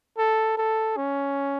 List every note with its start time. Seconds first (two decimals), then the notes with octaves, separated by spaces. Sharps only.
0.18 A4
0.57 A4
0.97 C#4